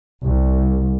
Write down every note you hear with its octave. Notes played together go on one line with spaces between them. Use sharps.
C2